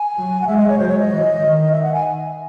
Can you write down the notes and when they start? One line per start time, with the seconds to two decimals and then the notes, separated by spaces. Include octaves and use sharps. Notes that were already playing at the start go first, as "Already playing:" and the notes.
Already playing: G#5
0.16 F#3
0.42 F#5
0.47 G#3 E5
0.58 D#5
0.68 C#5
0.78 F#3 C5
0.88 C#5
0.99 D#5
1.09 E3
1.41 D#3
1.72 E5
1.83 F#5
1.93 G#5